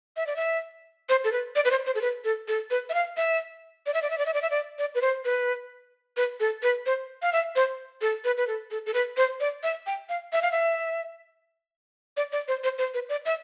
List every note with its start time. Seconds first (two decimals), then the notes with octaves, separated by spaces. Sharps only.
0.17 E5
0.27 D5
0.36 E5
1.09 C5
1.24 A4
1.32 B4
1.56 D5
1.65 B4
1.71 C5
1.86 C5
1.95 A4
2.02 B4
2.25 A4
2.48 A4
2.71 B4
2.89 E5
2.94 F5
3.17 E5
3.86 D5
3.94 E5
4.02 D5
4.10 E5
4.18 D5
4.26 E5
4.34 D5
4.42 E5
4.50 D5
4.79 D5
4.95 B4
5.02 C5
5.25 B4
6.17 B4
6.40 A4
6.63 B4
6.86 C5
7.22 F5
7.33 E5
7.56 C5
8.01 A4
8.24 B4
8.37 B4
8.47 A4
8.71 A4
8.86 A4
8.94 B4
9.17 C5
9.40 D5
9.63 E5
9.87 G5
10.09 F5
10.33 E5
10.42 F5
10.52 E5
12.17 D5
12.32 D5
12.48 C5
12.64 C5
12.78 C5
12.94 B4
13.09 D5
13.26 E5